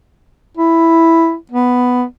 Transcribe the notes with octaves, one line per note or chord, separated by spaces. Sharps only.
E4
B3